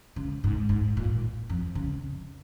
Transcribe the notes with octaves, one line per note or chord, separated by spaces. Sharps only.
C#3
G#2
G#2
A#2
F2
C#3